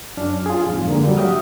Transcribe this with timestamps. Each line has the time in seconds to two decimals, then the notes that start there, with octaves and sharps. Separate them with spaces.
0.17 F#2 C#4 D4 F6
0.46 F4 G#4
0.66 F2 G#2
0.88 D3 A#3
1.05 F#3 G3
1.17 F#4 E5 G5 D#6 F6